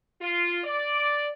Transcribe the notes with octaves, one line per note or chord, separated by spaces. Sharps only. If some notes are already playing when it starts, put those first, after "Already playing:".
F4
D5